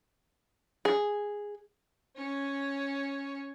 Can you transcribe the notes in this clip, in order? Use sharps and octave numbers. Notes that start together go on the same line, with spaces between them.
G#4
C#4 C#5